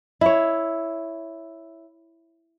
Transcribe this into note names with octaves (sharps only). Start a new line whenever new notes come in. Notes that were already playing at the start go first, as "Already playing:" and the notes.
E4 C#5